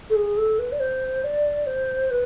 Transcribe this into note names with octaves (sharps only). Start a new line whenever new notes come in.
A4
G#4
A4
B4
D5
C5
D5
C5
B4